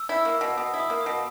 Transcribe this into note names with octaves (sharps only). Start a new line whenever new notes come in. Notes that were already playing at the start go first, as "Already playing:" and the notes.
Already playing: E6
E4
A#3
B2
B2 D#6
E4
D#6
A#3
D#6
B2